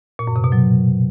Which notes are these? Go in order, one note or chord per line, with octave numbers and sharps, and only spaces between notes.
A#2
F#2
C3
B2
F#3